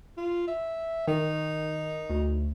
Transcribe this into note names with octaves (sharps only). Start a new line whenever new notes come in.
F4
E5
D#3 D#4
D2